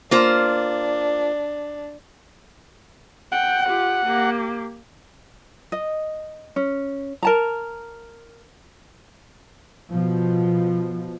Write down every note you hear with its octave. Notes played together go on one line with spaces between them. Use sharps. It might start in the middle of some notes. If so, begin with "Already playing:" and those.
A#3 D4 F4 C5
F#5 G5
F4 G4
A#3 G4
D#5
C#4
A#4 A5 A#5
B2 F3